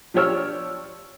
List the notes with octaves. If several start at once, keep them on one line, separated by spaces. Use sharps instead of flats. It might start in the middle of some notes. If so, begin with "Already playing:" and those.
F3 D4 G4 C#5 E6 F6